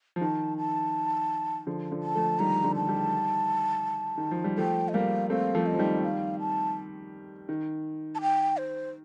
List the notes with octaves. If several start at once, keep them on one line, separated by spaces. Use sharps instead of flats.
F3
D#3 A5
A5
D3 F3
D3 F3
A5
F3 A3
D#3 G3 A#5
D3 F3
A5
D#3 G3
D#3
F3
G3
F3 A3 G5
D#5
G3 A#3 F5
A3 C4 F5
F3 A3
D#5
F3
D#3 G3
F5
A5
D#3
A5
G5
C5